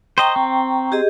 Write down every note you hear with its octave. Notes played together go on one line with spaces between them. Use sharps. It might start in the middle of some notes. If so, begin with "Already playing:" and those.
C5 D#5 G5 A#5 C#6
C4
G4 G#4 D#5